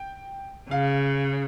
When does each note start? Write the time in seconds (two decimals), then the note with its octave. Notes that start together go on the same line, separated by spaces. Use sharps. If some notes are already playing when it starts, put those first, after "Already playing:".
Already playing: G5
0.71 C#3 F5